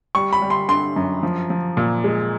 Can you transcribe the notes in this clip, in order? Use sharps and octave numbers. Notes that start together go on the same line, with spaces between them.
G3 C#6
B5
G3
C6
D3 C6
F#2
F3
F3
A#2
G#3